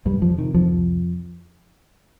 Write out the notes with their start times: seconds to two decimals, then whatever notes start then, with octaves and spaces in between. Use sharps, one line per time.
0.05 C2 G2 G3
0.22 F2 F3
0.38 C3 D#3
0.54 F2 F3
0.71 C2